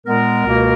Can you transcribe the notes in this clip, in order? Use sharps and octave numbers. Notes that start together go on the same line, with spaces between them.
A#2 G#3 B3 A#4
C#2 B2 A#3